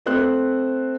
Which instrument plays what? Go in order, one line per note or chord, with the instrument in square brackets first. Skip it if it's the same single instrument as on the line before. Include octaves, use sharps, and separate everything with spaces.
[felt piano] A3 C4 C5 F#6